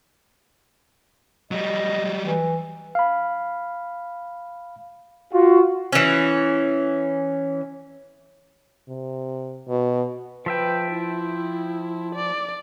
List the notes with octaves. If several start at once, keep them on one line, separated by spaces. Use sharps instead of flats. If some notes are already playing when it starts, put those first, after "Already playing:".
F#3 G3 D#5
E3
F5 B5
F4 F#4
E3 C#4
C3
B2
F3 B4 E5 G5
E4
D5